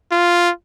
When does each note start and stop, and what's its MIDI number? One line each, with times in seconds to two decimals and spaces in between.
0.12 0.50 65